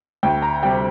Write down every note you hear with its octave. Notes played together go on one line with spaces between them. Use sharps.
D2 G5
A#5
C3 G3 G5